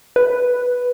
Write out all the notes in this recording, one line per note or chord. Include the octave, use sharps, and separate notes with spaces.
B4